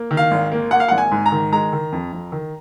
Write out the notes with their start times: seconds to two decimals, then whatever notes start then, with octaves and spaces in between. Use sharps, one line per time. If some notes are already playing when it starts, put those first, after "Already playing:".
Already playing: A#3
0.11 D#3
0.17 F5
0.31 G#1
0.52 A#3
0.71 A#3 F#5
0.80 F5
0.88 G#1 F#5
0.98 G#5
1.11 G#2
1.26 A#5
1.32 D#3
1.52 G#3 A#5
1.73 D#3
1.92 F2
2.13 F2
2.32 D#3